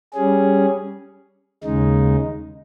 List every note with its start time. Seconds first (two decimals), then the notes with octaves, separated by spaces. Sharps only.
0.14 G3 C#4 G#4
1.64 D#2 C#3 G#3 D#4